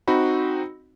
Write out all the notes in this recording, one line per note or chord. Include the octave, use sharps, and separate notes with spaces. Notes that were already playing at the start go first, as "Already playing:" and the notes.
C4 D#4 F#4 B5